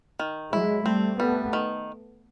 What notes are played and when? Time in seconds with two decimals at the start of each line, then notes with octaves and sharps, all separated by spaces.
0.20 D#3
0.52 F#3 G#3 E4
0.85 G3 A3 C4
1.19 G3 A3 B3
1.53 D#3